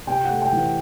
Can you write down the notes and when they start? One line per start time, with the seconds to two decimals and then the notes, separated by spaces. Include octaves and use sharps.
0.07 C3 G5
0.25 F#5
0.30 A3
0.42 G5
0.52 E3
0.58 F#5